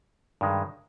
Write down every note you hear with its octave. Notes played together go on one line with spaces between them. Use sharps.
G2 D#3 G#3